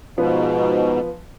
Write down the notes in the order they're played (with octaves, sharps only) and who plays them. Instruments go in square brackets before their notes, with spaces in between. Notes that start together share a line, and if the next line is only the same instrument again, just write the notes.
[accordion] G#2 B2 [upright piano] F3 B3